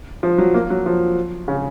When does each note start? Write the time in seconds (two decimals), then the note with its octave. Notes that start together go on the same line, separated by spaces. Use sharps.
0.23 F3
0.38 F#3
0.54 A#3
0.70 F#3
0.86 F3
1.48 C#3